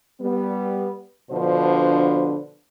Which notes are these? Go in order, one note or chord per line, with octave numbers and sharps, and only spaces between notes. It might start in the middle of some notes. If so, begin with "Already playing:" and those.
G3 B3
B2 D3 F3 D4 B4 C5